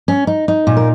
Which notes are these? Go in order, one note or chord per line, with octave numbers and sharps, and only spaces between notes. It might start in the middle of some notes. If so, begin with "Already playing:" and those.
C#4
D#4
D#4
A#2
A#4